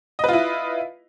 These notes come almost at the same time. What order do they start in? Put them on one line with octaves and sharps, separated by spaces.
D#5 B4 F4 E4